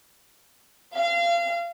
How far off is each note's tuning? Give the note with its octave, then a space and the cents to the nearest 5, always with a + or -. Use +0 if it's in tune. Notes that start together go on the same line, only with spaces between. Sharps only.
F5 -30